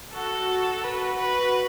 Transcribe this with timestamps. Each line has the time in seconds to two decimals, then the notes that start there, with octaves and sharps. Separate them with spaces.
0.14 F#4 A4
0.84 B4
1.18 B4